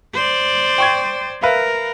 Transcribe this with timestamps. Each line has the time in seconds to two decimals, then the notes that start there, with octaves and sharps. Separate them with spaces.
0.14 C5 D5
0.78 G5 C#6 G#6
1.42 A#4 B4 E5 F5